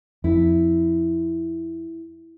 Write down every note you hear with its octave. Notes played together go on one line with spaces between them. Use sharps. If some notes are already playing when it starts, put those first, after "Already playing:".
F2 E4